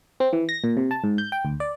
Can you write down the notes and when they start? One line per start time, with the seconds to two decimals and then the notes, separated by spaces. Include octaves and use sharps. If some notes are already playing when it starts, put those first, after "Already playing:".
0.20 C4
0.33 E3
0.49 A#6
0.64 A#2
0.77 C3
0.91 A5
1.04 G#2
1.18 G6
1.32 G5
1.45 D2
1.60 D5